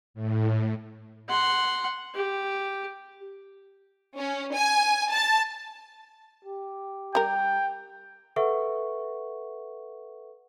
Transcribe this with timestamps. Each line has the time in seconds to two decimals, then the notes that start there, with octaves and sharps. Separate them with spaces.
0.14 A2
1.29 F#5 C6
2.14 G4
4.18 C#4
4.56 G#5
5.11 A5
6.45 G4
7.15 G3 A#4 G5
8.36 A4 B4 E5 F#5 C#6